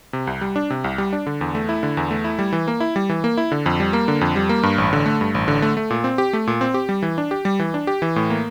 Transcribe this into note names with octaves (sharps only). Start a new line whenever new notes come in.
C3
C2
G3
D4
C3
C2
G3
D4
D3
E2
A3
E4
D3
E2
A3
E4
G3
E3
A#3
E4
G3
E3
A#3
E4
D3
F2
G3
A#3
D3
F2
G3
A#3
G2
A1
D3
A3
G2
A1
D3
A3
A3
A#2
C4
G4
A3
A#2
C4
G4
G3
E3
D4
G4
G3
E3
D4
G4
E3
A2
A#3